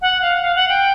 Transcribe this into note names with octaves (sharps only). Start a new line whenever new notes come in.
F#5
F5
F5
F#5
G5